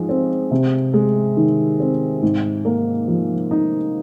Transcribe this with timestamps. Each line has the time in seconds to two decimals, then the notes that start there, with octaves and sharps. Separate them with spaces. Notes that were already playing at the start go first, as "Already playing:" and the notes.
Already playing: G#2 F3 G#3
0.09 C4
0.51 C3
0.94 G#3
1.37 D#3
1.80 C4
2.22 G#2
2.65 A#3
3.08 F3
3.51 D#4